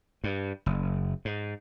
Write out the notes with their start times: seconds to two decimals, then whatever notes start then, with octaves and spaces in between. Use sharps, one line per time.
0.24 G2
0.66 F#1
1.25 G#2